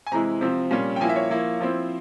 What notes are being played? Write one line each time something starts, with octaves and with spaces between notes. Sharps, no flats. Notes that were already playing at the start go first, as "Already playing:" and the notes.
G#5
C3 E3 G#3 E4 A#5
C3 F3 C4
A#2 G3 C#4
G5
F3 A#3 E4 G#5
E5
C#5
F3 A#3 E4
F3 C4 E4